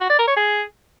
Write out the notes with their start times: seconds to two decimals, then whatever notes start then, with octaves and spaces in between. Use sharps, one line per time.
0.01 F#4
0.10 D5
0.19 A#4
0.28 C#5
0.36 G#4